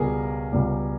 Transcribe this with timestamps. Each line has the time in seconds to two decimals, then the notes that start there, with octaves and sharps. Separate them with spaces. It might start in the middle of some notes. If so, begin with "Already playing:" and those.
Already playing: C#2 B2 G3 G#4 A#4
0.52 C#2 B2 G3